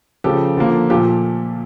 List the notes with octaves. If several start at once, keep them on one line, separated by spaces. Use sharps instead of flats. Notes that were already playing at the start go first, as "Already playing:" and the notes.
C#3 F3 A3 G4 A4
D3 F3 A#3
A#2 F3 A3 F4 G4